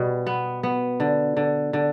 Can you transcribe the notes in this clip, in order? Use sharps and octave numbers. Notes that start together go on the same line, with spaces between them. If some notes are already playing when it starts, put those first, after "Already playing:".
Already playing: B2 G3
B3
B3
D3
D3
D3